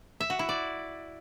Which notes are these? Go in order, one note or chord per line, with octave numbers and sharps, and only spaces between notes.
E5
F#4
E4
D5